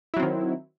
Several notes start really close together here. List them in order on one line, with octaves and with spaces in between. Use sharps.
E4 F#3 C4 D#3